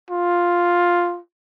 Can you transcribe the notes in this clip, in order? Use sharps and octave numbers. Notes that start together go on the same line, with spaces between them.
F4